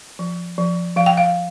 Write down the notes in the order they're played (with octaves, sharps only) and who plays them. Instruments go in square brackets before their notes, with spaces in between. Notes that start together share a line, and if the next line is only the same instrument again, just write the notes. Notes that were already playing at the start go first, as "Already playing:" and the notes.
[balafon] F3
F3
F3 F5
G5
F5